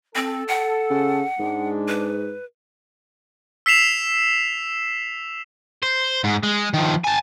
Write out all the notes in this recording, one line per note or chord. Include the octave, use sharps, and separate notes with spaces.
C4 A4
F#5
C#3
G#2 G#3 D4
B4
E6 B6 C7 E7 F7
C5
G#2
G#3
D#3 F3
G#5 A5